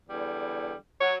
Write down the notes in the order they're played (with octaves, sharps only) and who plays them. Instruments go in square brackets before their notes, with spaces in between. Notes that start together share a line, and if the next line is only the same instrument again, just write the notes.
[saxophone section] E2 D3 G3
[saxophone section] F#3 [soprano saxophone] C#5